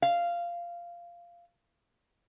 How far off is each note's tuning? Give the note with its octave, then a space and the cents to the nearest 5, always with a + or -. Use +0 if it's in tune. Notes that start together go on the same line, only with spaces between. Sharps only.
F5 -10